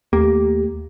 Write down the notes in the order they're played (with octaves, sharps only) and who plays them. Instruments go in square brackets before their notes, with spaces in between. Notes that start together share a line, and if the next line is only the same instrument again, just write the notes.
[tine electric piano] D#2 A3 [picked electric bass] A#3 [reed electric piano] G4